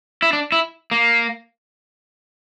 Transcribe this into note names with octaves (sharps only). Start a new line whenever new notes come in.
E4
D4
E4
A#3